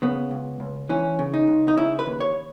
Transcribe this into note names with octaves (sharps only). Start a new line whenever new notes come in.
C#3 B3
C#2
C#2
E3 C#4
C#3
D#4
C#2
D#4
C#3 E4
B4
D#2
C#5